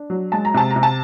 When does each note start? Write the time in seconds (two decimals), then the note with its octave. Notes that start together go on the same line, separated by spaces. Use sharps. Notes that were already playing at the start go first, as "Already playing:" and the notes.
Already playing: D4
0.10 F#3
0.32 G#3 A5
0.45 A#5
0.54 C3 A5
0.70 A#5
0.76 C3
0.83 A5